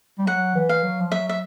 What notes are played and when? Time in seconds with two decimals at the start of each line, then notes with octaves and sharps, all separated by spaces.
0.19 G3
0.26 F#3 F#5
0.55 E3
0.69 F5
0.83 F#3
1.00 F3
1.12 F#3 E5
1.29 E5